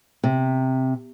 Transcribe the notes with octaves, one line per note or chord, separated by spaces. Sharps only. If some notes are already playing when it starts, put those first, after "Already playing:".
C3